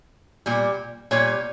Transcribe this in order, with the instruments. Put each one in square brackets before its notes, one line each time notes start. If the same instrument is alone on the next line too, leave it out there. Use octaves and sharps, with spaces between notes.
[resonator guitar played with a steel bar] A#2 G3
A#2 G3 C#5